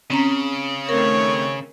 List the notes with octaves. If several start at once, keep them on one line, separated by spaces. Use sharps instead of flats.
C#3 C4 C#4 A#5
D#3 A3 C4 A#4 C#5